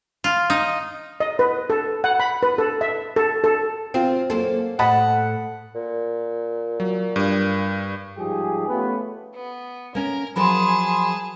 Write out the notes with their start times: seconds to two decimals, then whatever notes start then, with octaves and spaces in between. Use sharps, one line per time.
0.24 F4
0.50 D#4
1.20 D#5
1.39 B4
1.70 A4
2.04 F#5
2.20 B5
2.43 B4
2.58 A4
2.81 E5
3.16 A4
3.44 A4
3.94 C4 F4 C5
4.30 F#2 A#3 A4 C5
4.79 A2 D#5 F#5 A5 B5
5.75 A#2
6.80 F#3
7.16 G2
8.18 G#2 F3 G3 G4 G#4
8.68 A3 B3 C#4 F4 G4 B4
9.34 B3
9.95 A#3 C#4 A#4
10.36 F3 F#3 G#4 A#4 A5 B5 C6